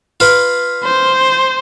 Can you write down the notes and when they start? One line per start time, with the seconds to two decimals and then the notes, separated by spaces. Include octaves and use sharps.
0.20 F4 B4
0.84 C5